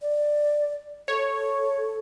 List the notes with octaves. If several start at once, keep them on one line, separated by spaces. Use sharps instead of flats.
D5
A4 C#5